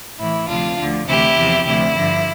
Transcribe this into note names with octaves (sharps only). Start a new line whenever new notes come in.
A2 E3 E4
D2 C3 F3 D4 F4
D2 D3 F3
D2 C3 E3 E4 G4
E2 C3 F3
D2 C3 F3 E4
G2 D3 F3